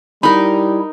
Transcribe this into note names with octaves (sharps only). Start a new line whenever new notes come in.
G3 D#4 E4 A#4 B5